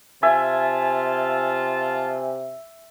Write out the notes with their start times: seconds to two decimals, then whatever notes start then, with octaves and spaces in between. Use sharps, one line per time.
0.23 C3 F4 E5 G#5 A5